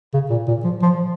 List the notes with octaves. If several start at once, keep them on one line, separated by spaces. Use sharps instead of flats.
C#3
A#2
A#2
F3
F3